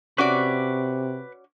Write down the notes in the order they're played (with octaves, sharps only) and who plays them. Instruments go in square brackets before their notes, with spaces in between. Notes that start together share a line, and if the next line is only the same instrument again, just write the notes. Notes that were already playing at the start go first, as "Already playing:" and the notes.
[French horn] C3 [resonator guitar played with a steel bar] C#4 F#4 D5 [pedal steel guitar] B4 C#6 D6